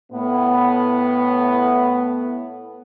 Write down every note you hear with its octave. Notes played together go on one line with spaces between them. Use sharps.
A2 B3